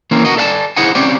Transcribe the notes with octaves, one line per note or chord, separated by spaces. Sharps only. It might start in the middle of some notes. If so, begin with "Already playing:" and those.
E3 A#3 C4 C#4
F#4 A#4 D#5
A4 D5 E5 F#5 G#5 A5
E4 G#4 C5 D#5 F#5 G#5
C4 C#4 G4 C5 D5 G#5